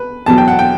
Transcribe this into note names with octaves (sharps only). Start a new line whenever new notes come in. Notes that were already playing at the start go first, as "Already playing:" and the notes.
Already playing: B4
E2 B2 F#3 A5
G5
F#5
G5